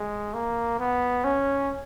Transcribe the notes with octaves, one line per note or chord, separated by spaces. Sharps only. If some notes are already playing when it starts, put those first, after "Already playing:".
Already playing: G#3
A#3
B3
C#4